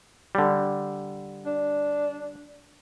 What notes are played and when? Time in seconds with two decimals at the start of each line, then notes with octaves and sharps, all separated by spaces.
0.35 D3 G3
1.46 D4